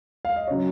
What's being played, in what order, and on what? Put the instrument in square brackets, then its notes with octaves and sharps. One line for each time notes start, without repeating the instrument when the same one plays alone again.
[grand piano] F5
D#5
C#3 F#3 C#5